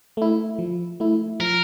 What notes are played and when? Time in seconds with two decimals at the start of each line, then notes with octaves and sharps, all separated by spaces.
0.17 A3 E4
0.59 F3
1.00 A3 E4
1.40 F3 A#4